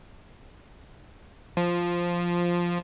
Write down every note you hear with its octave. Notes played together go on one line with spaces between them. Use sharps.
F3